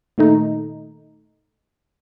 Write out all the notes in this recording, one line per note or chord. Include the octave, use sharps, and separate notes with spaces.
A#2 D#3 A3 D#4